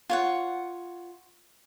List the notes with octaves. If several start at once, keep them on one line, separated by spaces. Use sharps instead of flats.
F4 C#5 F#5